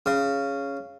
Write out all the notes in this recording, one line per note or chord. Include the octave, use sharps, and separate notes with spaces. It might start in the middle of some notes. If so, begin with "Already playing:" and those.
C#3